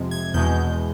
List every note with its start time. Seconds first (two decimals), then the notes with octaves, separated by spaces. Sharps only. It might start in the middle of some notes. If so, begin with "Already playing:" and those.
Already playing: F2 C3 F3 G#3
0.11 G#6
0.34 E2 B2 G#3 G6